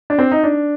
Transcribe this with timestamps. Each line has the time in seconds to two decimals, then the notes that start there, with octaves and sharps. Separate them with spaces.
0.10 D4
0.18 C4
0.32 D#4
0.44 D4